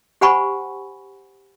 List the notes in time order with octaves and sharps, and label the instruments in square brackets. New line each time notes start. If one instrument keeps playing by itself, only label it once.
[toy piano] G4 C5 F#5 G#5 B5 C#6